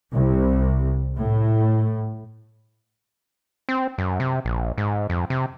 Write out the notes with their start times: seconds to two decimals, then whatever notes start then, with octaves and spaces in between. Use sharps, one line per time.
0.12 C2
1.18 A2
3.69 C4
3.98 F#2
4.20 C3
4.45 A#1
4.78 G#2
5.10 F2
5.30 C3